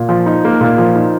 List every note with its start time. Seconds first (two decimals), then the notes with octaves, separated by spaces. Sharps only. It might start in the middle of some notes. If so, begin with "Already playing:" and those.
Already playing: A#2
0.09 F3
0.26 D#4
0.45 A#3
0.61 A#2
0.78 F3
0.96 D#4